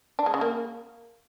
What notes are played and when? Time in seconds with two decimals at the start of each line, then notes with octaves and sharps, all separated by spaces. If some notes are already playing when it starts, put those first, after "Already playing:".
0.19 D4
0.26 G#3
0.34 C#3
0.41 A#3